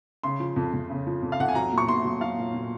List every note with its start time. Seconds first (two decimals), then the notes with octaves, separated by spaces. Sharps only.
0.23 C#3 C6
0.40 F3
0.56 F2
0.73 F2
0.90 C#3
1.07 F3
1.23 F2
1.32 F5
1.39 F2 F#5
1.48 G#5
1.55 F#3 A#5
1.72 A#2
1.78 C#6
1.88 A#2 C6
2.05 F#3
2.21 F#3 F5
2.38 A#2
2.54 A#2